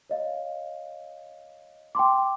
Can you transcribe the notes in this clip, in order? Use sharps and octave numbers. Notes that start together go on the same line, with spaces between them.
C#5 D#5 F5
G5 A5 C6 D6